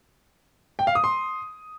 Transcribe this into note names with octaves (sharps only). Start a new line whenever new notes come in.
G5
F5
D#6
C6